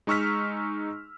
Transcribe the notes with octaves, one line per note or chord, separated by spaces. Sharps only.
G#3 D#4 C#6 E6 F6 B6